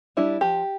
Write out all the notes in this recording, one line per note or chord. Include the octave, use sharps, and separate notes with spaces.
G3 D4 E4
F3 G4